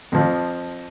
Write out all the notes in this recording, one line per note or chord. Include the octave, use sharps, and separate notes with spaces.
F2 F3